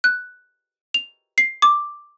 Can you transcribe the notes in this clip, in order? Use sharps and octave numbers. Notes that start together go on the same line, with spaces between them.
F#6
F7
C7
D6